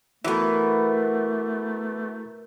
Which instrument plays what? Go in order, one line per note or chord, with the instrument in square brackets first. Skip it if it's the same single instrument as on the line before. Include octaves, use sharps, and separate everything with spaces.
[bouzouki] E3 B3 [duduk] A3 [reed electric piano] E4 F#4 A4 [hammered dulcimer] A#4 C#6